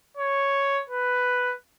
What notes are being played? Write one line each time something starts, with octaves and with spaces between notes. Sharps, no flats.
C#5
B4